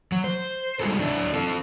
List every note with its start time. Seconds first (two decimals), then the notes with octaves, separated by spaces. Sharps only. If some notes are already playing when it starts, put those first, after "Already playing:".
0.12 F#3
0.24 C5
0.80 G3 G#3 D#4 F#4 G#4 A4
0.99 F#3 D4 E4
1.34 C4 A4